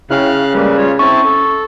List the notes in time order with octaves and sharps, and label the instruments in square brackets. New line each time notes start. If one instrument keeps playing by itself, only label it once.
[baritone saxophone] C#3 [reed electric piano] E4 C#5 G5 [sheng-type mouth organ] F5 F6 F#6
[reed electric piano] G3 G#3 D5 [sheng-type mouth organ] A#3 B4
[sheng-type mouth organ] F4 C#5
[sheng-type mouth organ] C4 E4 A5 [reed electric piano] C#4 [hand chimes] C#6
[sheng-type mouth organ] A4